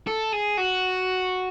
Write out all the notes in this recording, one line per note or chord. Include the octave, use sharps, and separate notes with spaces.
A4
G#4
F#4